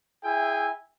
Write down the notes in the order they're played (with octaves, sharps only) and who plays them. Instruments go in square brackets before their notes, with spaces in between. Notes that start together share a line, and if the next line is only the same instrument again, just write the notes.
[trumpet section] E4 G#4 E5 G5 G#5